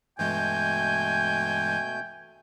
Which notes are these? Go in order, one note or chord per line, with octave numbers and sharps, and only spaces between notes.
G2 B2 E3 G#3 A3 G5 G#5 G6